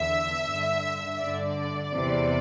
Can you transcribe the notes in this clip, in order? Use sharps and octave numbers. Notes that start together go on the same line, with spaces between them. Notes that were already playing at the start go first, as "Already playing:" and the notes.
Already playing: E2 D3 E5
G2 D3
G2 D3 D5
E2 C3 E3